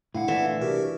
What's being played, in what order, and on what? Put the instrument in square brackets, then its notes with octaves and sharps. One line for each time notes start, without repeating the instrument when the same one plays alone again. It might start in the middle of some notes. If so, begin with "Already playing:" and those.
[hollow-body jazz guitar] A2 D3 [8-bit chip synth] E4 F5 F#5
[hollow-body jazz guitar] A#2 A3 D4 [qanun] E3 E5
[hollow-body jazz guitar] C2 D4 [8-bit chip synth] F#4 G4 A#4